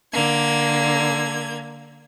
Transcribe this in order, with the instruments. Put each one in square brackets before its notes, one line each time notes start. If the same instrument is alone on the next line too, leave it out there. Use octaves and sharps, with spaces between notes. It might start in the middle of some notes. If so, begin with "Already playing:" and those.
[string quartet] D3 A#3 G#6